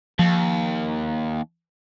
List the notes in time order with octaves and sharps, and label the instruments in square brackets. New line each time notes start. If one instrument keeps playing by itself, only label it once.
[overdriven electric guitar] D#2 [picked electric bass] F3